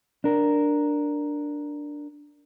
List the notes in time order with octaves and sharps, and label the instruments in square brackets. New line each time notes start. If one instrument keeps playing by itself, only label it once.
[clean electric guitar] D4 A#4